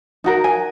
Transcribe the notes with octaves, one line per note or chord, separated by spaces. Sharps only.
D#4 F#4 A#4
G#5